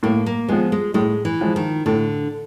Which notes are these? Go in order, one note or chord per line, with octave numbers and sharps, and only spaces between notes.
A2 A#3
A#3
F3 G#3 B3
G#3
A2 G#3
E3
F3 G#3
D#3
A2 D3